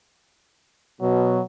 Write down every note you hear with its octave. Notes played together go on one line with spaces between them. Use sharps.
B2 F#3